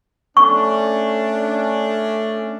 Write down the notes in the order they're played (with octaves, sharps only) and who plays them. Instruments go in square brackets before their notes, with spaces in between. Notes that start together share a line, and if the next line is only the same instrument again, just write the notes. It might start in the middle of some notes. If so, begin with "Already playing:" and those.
[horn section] A3 C#4 D4 [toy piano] C#6